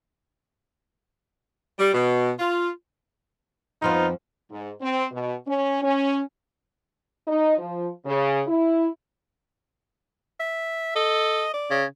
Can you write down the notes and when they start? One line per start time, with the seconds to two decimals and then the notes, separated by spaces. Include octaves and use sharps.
1.79 G3
1.94 B2
2.39 F4
3.82 F2 F3 B3 C4 D#4 F4
4.50 G#2
4.81 C4
5.11 B2
5.47 C#4
5.82 C#4
7.28 D#4
7.58 F3
8.06 C#3
8.48 E4
10.40 E5
10.96 A4 D#5
11.54 D5
11.71 C#3